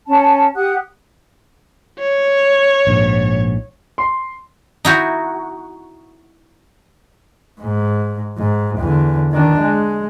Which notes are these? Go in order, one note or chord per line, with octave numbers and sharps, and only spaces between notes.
C#4 A5
G4 F#5 D#6 F#6
C#5
A#1 G#2
C6
D#4 E4 F#4
G#2
G#2
E2 D3
D#3 D4
G#3